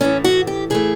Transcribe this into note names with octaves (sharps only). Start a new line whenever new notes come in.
A2 E3 A3 C#4
F#4
G4
A2 E3 A3 G#4